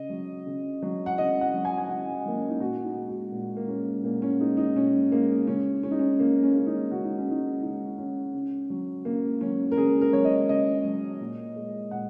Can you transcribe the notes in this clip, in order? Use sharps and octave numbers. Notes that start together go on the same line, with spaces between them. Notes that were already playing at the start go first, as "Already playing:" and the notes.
Already playing: C#3 D#5
F#3
C#3
F#3
F#5
C#3 D#5
F#5
F#3
G#5
G#5
C#3 F#5
F#3 A#3
C#4
D#4
A#2 F#4
D#4
G#3
F#4
A#2
A#3
G#3 C#4
A#2 A#3
C#4
G#3 D#4
D#4
A#2 C#4
G#3 A#3
C#3 C#4
G#3 C#4
D#4
C#4
C#3 A#3
C#4
A#3
G#3 C#4
D#4
C#3 F#4
D#4
C#4
G#3 D#4
C#3 D#4
G#3 C#4
C#3
F#3
C#3 A#3
F#3 C#4
A#4
C#3 G#4
A#4
F#3 C#5
D#5
C#3 D#5
F#3
A#2
G#3
A#2 F#5